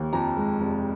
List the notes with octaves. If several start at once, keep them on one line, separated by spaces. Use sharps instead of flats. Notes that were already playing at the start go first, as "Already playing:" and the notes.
Already playing: D#2
F2 A#5
G#3
F1